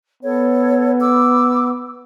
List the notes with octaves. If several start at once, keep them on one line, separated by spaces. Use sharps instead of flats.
B3 A4 C#5
D6 E6